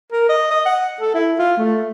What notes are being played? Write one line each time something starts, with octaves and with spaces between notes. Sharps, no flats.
A#4
D#5
D#5
F#5
A4
E4
F4
A3